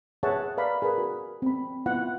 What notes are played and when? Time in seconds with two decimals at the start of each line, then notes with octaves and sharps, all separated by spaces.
0.23 G#4 B4 C#5 E5 F#5 A5
0.57 B4 D5 F5 A#5 B5
0.82 G#4 A#4 B4 B5
0.98 F#4
1.42 C4 B5
1.86 B3 E4 F4 F#5